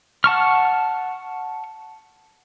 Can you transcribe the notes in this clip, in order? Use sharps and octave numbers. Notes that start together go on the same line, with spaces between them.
F#5 A5 C#6 F6